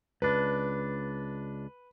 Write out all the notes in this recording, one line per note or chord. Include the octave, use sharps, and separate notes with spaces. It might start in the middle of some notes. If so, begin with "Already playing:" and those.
C#2 D4 B4